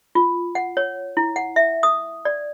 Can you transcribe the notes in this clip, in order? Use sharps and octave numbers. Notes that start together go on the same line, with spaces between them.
F4
F#5
C#5
E4
F#5
E5
D#6
D5